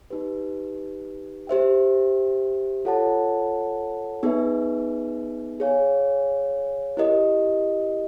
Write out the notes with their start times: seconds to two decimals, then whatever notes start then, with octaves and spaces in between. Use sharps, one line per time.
0.10 D#4 G4 B4
1.47 G4 C5 E5 G5
2.85 F4 A4 C#5 F#5 A5
4.23 B3 D#4 G#4 B4 E5
5.60 G#4 C#5 F5 G#5
6.97 E4 G4 A#4 D#5